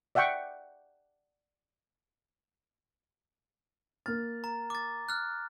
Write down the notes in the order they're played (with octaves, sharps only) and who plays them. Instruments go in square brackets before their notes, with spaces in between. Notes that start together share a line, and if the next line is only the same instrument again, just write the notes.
[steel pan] D5 E5 F#5 G5 C#6
[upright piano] A#3 F6 [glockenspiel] A6
[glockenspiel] A#5
D6 A6
F6 F#6